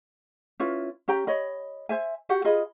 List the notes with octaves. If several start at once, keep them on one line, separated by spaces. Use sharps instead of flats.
C#4 E4 F4 B4
C#4 G4 G5 A#5
C#5 D#5 B5
C5 E5 G#5
F#4 G4 F#5
F4 G#4 D#5 B5